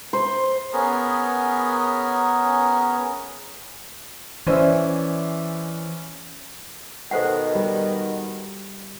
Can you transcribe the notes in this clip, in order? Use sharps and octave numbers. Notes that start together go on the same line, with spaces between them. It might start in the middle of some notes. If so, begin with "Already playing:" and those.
C5
B3 C#4 G#4 A#4
E3 C#4 C5 D5 E5
B2 D#3 A4 C5 F#5
G3